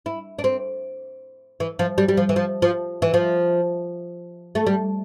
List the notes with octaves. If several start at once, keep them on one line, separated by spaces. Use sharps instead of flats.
E4
D4
C4
E3
F3
G3
G3
F3
E3
F3
F3
E3
F3
A3
G3